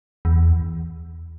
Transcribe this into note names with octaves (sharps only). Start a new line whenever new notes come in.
E2